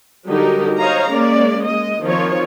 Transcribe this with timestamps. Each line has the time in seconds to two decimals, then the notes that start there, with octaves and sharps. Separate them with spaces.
0.28 D3 F#3 G3 D#4 G4 A#4
0.79 C5 C#5 D#5 F5 A#5
1.09 G#3 A#3 C#4 D5
1.66 G#3 D#5
2.04 D#3 F3 C4 F4 C#5